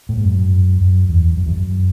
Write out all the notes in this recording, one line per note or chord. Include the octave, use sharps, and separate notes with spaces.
A2
G#2
F#2
F#2
E2
F#2
E2
F#2